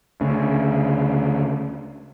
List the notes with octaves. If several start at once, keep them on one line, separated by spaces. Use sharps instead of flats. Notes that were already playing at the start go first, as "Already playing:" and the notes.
D2 C#3